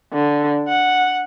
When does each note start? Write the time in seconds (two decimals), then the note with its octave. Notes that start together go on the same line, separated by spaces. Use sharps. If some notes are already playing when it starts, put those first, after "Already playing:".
0.13 D3
0.68 F#5